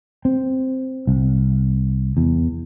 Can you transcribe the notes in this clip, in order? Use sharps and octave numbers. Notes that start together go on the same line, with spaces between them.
C4
C2
E2